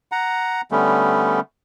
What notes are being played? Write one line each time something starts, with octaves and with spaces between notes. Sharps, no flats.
F#5 A#5
D3 G3 A3 B3 C#4